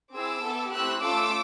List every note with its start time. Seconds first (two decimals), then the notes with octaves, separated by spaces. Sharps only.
0.14 C4 E4 G#4 D6 E6
0.44 B3 E4 A4
0.72 A3 C4 E4 G4 E6 F#6
1.01 A3 C#4 F4 A4 D6 E6